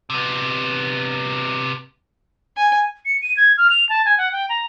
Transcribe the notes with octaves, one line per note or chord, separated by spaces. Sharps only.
C3 B3
G#5
C#7
D#7
G#6
F6
F7
A5
G#5
F#5
G5
A#5